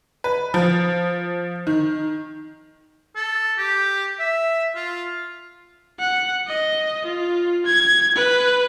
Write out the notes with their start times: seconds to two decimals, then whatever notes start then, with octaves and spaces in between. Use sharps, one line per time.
0.24 B4
0.54 F3
1.67 D#3
3.16 A4
3.58 G4
4.19 E5
4.75 F4
5.99 F#5
6.47 D#5
7.05 F4
7.66 G#6
8.16 B4